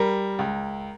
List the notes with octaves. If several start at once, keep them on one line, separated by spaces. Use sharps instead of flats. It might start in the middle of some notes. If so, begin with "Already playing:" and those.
Already playing: G3 A#4
C#2